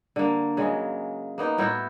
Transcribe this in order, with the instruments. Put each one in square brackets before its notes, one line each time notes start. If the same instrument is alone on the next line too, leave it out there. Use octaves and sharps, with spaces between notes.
[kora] D3 A#3
C#3 F#3 G#3
A#3 B3 D#4
A2 E4 F#4 G5